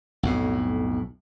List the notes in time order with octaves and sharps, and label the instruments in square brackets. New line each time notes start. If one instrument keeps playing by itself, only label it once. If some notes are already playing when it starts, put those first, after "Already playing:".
[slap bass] B1 F2 A2